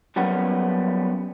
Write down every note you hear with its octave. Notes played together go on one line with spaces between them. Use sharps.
F#3 G3 A#3 B3 C#4